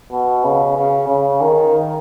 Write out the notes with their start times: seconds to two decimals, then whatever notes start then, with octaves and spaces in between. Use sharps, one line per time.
0.12 B2
0.44 C#3
0.77 C#3
1.09 C#3
1.41 D#3